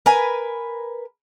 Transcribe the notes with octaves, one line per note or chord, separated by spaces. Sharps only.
A#4 B4 G#5